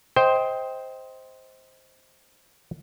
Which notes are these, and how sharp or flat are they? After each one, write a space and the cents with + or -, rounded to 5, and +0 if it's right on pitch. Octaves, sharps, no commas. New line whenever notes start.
C5 +0 D#5 +20 G5 +0